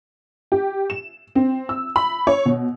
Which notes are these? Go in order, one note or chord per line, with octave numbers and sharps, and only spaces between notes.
G4
E7
C4
E6
B5
C#5
B2